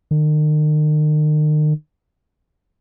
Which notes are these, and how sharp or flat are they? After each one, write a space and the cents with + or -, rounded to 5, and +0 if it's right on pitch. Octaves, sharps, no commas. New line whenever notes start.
D#3 -40